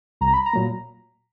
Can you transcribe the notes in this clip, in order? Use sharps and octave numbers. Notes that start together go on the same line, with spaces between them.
C2 A#5
B5
A#5
A#2 F#3 A#3